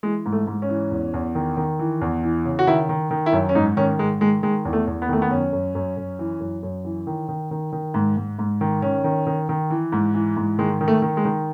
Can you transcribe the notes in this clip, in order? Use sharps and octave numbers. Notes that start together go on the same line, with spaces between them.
E3 G#3
G#2
A3
G#2
C#4
E3
E2
E2
D#3
D#3
E3
E2
E3
C#3
F#4
D#3 E4
D#3
D#3
E4
F#2
C#4
G#2 D#4
D#3 C#4
G#2 G#3
D#3 G#3
D#3 G#3
E2
A3
E2
B3
D#3 A3
B3
F#2 C#4
F#2
F#2
F#2
E3
F#2
F#2
E3
D#3
D#3
D#3
D#3
G#2
G#2
G#2
D#3
D#3 C#4
D#3
D#3
D#3
E3
G#2
E3
G#2
D#3 G#3
D#3
A3
D#3
G#3
D#3